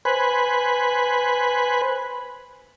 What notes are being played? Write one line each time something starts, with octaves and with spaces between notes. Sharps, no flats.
B4 C5 G#5 B5 F#6